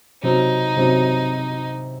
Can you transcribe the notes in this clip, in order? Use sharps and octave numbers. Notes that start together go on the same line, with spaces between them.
C3 F#3 C4 D#4
C3 F#3 C4